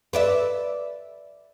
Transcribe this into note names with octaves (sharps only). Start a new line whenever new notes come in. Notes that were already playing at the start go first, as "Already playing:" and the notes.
B4 D5 E5